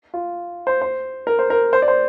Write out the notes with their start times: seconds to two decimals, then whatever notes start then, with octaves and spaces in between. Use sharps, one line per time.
0.14 F4
0.67 C5
0.82 C5
1.27 A#4
1.39 C5
1.50 A#4
1.73 C5
1.82 D5
1.88 C5